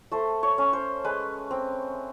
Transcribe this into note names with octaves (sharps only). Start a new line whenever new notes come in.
A3 C5
C#5
C#4
C5
G#3 B4
C4